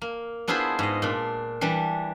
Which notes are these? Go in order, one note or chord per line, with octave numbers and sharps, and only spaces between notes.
A#3
B3 D4 E4 F4 G#4 C5
G#2 D#5
A#2 D4
E3 G3 D4